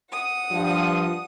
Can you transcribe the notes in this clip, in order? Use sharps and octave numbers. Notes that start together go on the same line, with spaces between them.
F#5 D#6
G2 F3